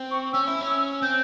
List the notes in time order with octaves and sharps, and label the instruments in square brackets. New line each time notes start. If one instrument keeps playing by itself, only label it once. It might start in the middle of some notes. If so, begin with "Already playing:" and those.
Already playing: [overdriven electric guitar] C4
[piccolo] C#6
[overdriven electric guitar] C#4 [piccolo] E6
[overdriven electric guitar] E4
C#4
[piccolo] E6
[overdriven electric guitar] C4 [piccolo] G6